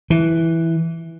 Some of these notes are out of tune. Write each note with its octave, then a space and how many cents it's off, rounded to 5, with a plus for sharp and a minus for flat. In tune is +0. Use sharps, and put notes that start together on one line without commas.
E3 -5